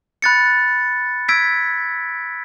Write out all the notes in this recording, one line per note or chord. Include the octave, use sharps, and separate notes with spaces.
B5 F#6 A6 C#7
E6 G#6 B6 D7